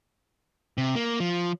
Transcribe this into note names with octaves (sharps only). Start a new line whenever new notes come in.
C3
A#3
F3